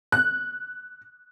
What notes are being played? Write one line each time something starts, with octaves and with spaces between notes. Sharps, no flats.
F#6